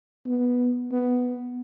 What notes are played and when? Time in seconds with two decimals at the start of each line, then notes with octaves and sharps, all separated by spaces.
0.27 B3
0.91 B3